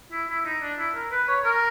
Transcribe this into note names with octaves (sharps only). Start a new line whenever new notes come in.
E4
E4
D#4
D4
E4
A#4
B4
C#5
A#4